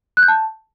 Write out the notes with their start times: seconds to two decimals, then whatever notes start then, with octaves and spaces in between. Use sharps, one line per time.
0.17 F#6
0.23 G6
0.28 A5